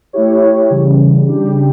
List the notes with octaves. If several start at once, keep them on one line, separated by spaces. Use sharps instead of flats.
A3 E4 G4 C#5
C#3 E3 G3
C#3 G3 D4 G4